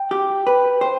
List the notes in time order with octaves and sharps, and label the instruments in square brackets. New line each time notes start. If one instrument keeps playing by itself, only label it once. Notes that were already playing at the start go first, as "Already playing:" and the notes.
Already playing: [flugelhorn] G5
[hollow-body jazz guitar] G4
B4
C5